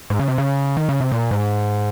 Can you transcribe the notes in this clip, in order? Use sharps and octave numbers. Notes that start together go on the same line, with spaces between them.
G#2
C#3
C3
C#3
D#3
C#3
C3
A#2
G#2